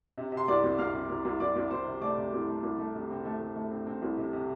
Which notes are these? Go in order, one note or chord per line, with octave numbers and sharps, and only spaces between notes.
C3
C3
C6
C2 D5 D6
C2
C2 F5 F6
C3
C2
C2
C2 D5 D6
C2
C2 C5 C6
C3
A3 D5 D6
C3
C2
A3
C2
A3
C3
C4
A3
A3
A3
C4
C4
C2
C3
C3